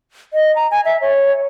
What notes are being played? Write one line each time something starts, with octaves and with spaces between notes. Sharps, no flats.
D#5
A#5
G#5
E5
C#5